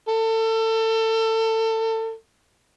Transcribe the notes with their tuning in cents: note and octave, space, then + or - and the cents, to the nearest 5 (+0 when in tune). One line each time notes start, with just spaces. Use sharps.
A4 +30